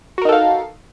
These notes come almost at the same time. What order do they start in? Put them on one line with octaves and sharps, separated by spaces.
F#4 A#4 D#4 A4 F5